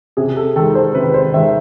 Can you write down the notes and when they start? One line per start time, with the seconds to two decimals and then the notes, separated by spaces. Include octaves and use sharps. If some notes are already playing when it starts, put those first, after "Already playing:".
0.17 C3 G#4
0.36 A4
0.56 D#3 A4
0.59 G#3
0.75 C5
0.95 C3 B4
1.14 C5
1.34 D#3 E5
1.37 G#3